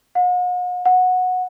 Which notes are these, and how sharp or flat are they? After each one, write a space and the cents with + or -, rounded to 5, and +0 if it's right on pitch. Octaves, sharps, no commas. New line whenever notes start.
F#5 -45
F#5 -15